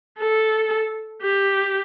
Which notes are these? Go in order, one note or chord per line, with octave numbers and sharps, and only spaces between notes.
A4
G4